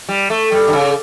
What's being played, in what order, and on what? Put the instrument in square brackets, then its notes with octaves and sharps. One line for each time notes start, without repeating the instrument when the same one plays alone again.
[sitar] G3
A3
G3
D3
C#3